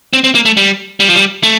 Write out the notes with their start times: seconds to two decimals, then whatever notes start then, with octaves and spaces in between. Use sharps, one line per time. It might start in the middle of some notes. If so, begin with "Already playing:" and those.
0.13 C4
0.24 C4
0.35 A#3
0.45 A3
0.57 G3
1.00 G3
1.08 F3
1.15 G3
1.43 A3